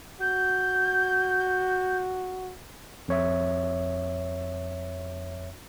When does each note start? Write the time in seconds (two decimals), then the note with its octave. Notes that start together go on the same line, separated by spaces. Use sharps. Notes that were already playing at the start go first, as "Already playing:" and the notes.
0.21 F#4 G6
3.08 F2 C#5 E5